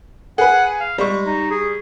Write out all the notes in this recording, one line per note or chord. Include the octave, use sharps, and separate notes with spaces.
G#4 B4 F#5
F5
G3 G#3 C#6
D#4
G#4